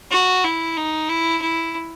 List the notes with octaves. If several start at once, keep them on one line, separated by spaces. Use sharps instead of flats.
F#4
E4
D#4
E4
E4